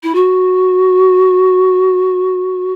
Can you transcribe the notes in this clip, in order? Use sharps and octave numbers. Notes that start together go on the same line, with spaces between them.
E4
F#4